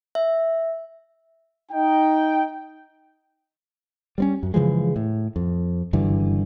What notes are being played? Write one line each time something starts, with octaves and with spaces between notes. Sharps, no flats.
E5
D#4 G5
G3 C4 C#4
F#2
C#3 E3 F3 G#3
A2
F2
F#1 G2 D3 E3